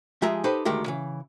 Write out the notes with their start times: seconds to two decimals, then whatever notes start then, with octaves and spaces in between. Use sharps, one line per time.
0.22 F3 G#3 G4 G#4 E5 A#5
0.44 D#4 G4 A4 B4 C5
0.65 D2 D#3 G#3 G4 A#4
0.86 C#3 E3